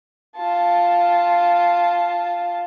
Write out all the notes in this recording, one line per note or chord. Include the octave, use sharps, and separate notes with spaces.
F4 A5